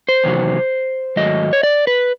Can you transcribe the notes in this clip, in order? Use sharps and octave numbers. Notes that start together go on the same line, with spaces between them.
C5
E2 C3 D#3 F#3
G#2 D#3 F#3 A3 D#5
C#5
D5
B4